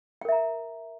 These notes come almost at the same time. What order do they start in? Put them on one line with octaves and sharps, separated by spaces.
G5 A#4 E5 A#5